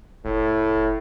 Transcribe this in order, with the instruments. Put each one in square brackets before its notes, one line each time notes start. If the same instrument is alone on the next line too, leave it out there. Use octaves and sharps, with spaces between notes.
[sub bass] F1 [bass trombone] A2